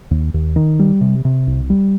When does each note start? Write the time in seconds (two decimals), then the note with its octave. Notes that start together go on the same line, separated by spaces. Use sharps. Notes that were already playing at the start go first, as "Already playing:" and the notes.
0.11 D#2
0.34 D#2
0.56 D#3
0.79 G3
1.01 C3
1.25 C3
1.47 C2
1.70 G3